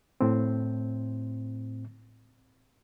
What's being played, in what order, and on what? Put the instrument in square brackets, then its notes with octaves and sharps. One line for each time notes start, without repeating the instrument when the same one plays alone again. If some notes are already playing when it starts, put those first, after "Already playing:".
[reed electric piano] A2 C4